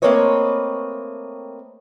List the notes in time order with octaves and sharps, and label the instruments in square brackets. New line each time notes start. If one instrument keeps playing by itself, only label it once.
[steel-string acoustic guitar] A3 A#3 C4 B4 C#5 D#5